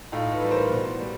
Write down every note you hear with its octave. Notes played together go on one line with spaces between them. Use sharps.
A2 D#4 F4
A4 B4
E3 G3
A#4 C5
B2
G3